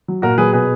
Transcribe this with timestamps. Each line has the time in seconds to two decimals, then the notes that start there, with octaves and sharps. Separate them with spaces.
0.08 F#3
0.22 A#2 F#4 A#4
0.38 F#3 G#4 B4
0.53 B2 G#4 B4